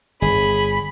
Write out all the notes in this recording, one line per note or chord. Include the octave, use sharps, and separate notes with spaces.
G1 G#4 B5